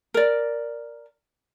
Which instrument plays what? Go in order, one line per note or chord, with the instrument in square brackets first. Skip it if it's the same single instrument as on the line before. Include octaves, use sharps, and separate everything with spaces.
[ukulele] A#4 D5